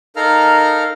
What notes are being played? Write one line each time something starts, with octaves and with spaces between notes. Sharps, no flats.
D#4 A4 A#4 F5 A#5 F6